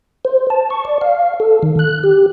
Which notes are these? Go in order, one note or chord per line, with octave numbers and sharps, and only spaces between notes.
C5
A5
C#6
D5
F5
A4
D#3
F#6
G4